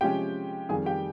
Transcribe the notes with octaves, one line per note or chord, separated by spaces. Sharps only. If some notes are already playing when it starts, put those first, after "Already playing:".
C3 F3 G#3 C#4 G4 G5
F2 D#3 G3 G#4 G#5
G4 G5